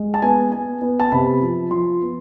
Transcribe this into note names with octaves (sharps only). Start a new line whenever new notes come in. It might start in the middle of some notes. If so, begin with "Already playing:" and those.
Already playing: G#3
A5
B3 G#5
B3 G#5
B3
A5
C3 B5
F3
F3 C6
B3